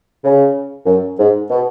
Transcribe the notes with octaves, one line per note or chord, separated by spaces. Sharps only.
C#3
F#2
G#2
B2